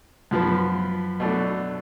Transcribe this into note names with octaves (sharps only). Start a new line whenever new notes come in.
F#2 F3 B3
B2 F#3 A3 D4